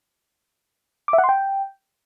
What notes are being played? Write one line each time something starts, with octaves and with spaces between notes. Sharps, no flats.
D6
E5
F#5
C6
G5